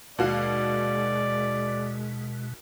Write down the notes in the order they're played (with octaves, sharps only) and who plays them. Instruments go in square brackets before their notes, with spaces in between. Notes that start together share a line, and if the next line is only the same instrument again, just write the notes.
[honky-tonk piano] D#2 F#4 F5 [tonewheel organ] B2 [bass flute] G#3 [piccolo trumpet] D5